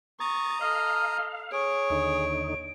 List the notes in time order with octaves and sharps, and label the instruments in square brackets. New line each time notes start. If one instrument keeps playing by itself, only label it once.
[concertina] A#5 D#6 [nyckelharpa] C#6 [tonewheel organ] A6
[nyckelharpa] A4 D#5 [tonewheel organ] F5 [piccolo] F6
[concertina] G#4 [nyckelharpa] C#5 [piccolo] D7
[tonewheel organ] D#2 D3 D#4